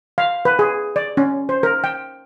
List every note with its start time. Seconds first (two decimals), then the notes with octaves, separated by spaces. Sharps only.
0.18 F5
0.45 B4
0.59 G#4
0.96 D5
1.17 C#4
1.49 C5
1.63 A#4
1.84 G5